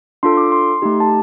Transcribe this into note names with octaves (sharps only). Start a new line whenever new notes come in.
D4 F4 A4 C6
D6
C6
A3 D#4 G4
A5